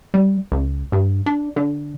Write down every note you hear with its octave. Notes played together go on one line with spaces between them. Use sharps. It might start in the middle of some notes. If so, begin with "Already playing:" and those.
G3
C#2
G2
D4
D3